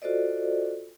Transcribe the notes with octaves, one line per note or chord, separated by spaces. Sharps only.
F4 F#4 A4 C5 D5 D#5